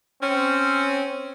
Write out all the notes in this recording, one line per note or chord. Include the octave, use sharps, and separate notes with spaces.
C4 C#4